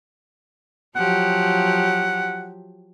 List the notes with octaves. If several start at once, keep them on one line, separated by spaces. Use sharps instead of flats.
F3 F#3 G4 F#5